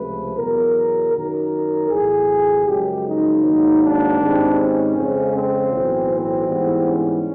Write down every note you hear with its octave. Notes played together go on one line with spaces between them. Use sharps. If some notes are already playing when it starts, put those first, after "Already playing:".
Already playing: C#2 C3 F3 A3 B4
E2 B2 F#3 B3 A#4
F#2 D#3 F#3 A#4
B1 A2 E3 A3 G#4
F#2 C#3 F3 G#3 G4
D#4
G#2 D#3 F#3 A#3
D4
G#2 D#3 G3 C4
C#4
F2 C#3 F3 G#3 C4
C4
B1 A2 E3
C4
G#2 E3 G3 B3
C#4